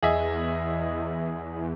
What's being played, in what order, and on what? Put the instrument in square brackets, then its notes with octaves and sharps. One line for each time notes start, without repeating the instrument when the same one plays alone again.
[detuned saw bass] E2 [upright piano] G#4 D#5 E5